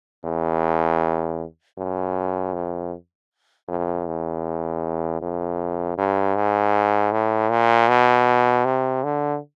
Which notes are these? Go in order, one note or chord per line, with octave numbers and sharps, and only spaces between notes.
E2
F#2
F2
F2
E2
F2
G2
G#2
A2
A#2
B2
C3
D3